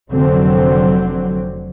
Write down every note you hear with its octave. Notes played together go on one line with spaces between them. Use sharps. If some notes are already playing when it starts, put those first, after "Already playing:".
F1 D3 F#3 C4